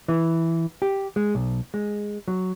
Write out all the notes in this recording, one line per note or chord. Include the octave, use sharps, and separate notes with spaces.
E3
G4
G#3
B1
G#3
F#3